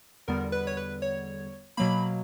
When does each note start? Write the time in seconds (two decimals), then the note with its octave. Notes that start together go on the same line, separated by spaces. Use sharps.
0.28 E2 D3 G3 B3 A#4
0.52 B4
0.67 C#5
0.77 B4
1.02 C#5
1.77 B2 F#3 A#3 B5